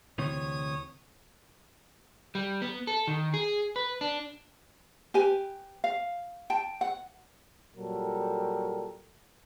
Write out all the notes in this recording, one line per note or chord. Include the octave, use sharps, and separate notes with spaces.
D2 C3 E3 C#5 D#6
G3
B3
A4
D#3
G#4
B4
D4
G4 B4 G#5
F5
G5 A5
F#5
A#2 F#3 G3 A4 A#4